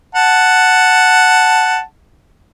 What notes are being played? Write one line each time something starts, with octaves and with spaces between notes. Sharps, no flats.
F#5 A5